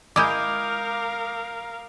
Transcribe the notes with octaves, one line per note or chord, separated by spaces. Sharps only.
G#3 E4 A#4 F5 D6 D#6 G6